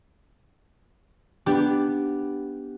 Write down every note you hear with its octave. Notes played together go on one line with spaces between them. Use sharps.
B3 D4 G4